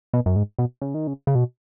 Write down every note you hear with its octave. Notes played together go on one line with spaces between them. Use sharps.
B2
F#2
G#2
B2
C#3
D#3
C#3
C#3
B2